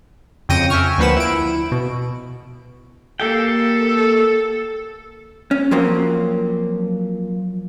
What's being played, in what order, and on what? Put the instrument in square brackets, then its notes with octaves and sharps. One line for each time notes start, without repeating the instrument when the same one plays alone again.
[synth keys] F2 C#3 G5 A#6 C#7 D#7
E5 G5 G#5 C#6 F6
D2 F3 A#3 B4 F#5 E7
E4 D7
B2
[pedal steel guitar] A#3 G4 G5 [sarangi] A4
[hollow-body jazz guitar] C#4
F3 F#3 A#3 C4